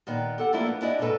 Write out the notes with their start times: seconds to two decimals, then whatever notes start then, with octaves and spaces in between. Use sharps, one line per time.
0.07 A#2 D#3 B3
0.38 G4 A4 F#5
0.53 F3 A3 A#3 D4 E4 F4
0.66 B3
0.81 C#4 D4 E4 F#4 D5 D#5
0.99 G#2 B2 G#3 C#4 A4 B4